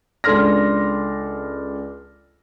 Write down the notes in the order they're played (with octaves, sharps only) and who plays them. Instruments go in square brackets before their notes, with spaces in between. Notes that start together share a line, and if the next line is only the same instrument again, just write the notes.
[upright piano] C#2 D4 A4 C6 F6 A#6